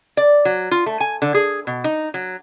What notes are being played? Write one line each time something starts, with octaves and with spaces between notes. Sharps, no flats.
D5
F#3
F4
A3
G#5
D3
G#4
B2
D#4
F#3